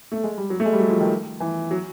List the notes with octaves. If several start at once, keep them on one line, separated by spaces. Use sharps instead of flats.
A3
G#3
G3
F#3
A3
G#3
G3
F#3
F3
D#3
E3
F#3